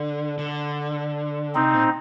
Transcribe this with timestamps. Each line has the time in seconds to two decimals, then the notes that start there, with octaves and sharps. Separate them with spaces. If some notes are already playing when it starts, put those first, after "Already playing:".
Already playing: D3
0.39 D3
1.55 C3 C4 D#4
1.74 A#2